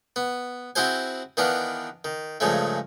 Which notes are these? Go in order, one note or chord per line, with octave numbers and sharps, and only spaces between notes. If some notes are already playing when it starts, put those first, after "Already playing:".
B3
C4 E4 F#4 G#4 C5 G#5
D#3 E3 B3 D4 F5
D#3
G2 C#3 F3 G#3 A3